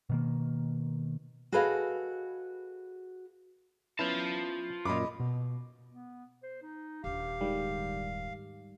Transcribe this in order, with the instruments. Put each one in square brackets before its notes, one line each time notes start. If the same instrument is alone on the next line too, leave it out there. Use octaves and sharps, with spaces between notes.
[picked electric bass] B2 D#3 A#3
[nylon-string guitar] F#4 G#4 A4 B4 D#5 F5
[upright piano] B3 C#4 [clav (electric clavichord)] E4 [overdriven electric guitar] F4 A5
[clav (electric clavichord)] F#2 A#2 [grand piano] D#5 B5 D6
[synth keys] B2
[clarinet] B3
C5
D#4
[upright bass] D#1 D4 [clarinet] G4 [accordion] F5
[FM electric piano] G#2 D#3 G3